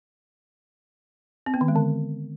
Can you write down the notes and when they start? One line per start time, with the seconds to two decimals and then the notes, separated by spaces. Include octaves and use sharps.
1.46 C4
1.54 B3
1.61 D#3
1.68 G#3
1.76 D3